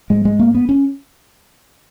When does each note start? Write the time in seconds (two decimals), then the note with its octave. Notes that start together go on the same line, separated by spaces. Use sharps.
0.10 G#2 G#3
0.25 G#3
0.39 A#3
0.55 B3
0.69 C#4